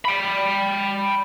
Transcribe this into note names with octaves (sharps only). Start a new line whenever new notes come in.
G5 B5